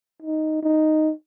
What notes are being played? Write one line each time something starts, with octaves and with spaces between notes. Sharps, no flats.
D#4
D#4